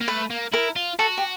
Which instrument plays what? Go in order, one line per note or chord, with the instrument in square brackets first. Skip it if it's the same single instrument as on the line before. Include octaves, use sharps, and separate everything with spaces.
[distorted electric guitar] A#3
[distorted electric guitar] A3 [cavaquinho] B4
[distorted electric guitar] A#3
[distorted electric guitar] E4 [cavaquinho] A#4
[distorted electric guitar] F4
[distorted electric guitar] F#4 [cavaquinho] A4
[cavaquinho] G4